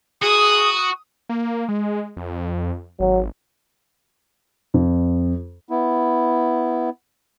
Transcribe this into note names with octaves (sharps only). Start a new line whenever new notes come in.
F#4 G#4 D#6
A#3
G#3
F2
G#1 F#3
F2
B3 E4